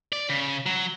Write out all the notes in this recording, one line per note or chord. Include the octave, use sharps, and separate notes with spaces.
D5
C#3
F#3